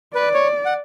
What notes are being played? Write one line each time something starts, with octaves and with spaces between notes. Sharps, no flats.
B4 D5
C#5
F#5